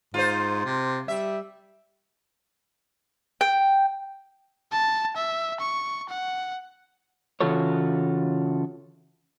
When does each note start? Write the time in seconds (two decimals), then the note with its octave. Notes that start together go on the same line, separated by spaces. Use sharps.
0.14 G#2 F4 C5
0.65 C3
1.08 G3 E5
3.41 G5
4.72 A5
5.16 E5
5.60 C#6
6.09 F#5
7.41 C#3 E3 F4 F#4 A4 C#5